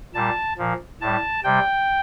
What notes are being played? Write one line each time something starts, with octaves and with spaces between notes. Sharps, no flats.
A#2 G3 A5
A#2 F3
A2 G3 A5
C3 G3 G5